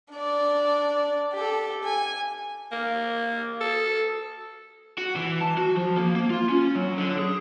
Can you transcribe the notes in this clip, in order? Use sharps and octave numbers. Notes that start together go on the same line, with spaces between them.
D4 D5
G4 A4
G#5
A#3
A4
F#4
E3
A5
F#4
F3
A#3
A#3
F4
C#4
F#3
D3
G#4